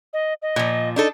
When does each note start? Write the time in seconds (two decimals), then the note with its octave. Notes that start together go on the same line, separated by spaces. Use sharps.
0.13 D#5
0.42 D#5
0.56 A#2 F3
0.96 D4 D#4 A4